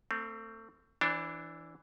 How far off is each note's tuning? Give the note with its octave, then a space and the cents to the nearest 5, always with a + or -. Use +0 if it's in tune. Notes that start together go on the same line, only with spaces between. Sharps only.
A3 +35 C4 +0
E3 +0 D4 +0 C5 +45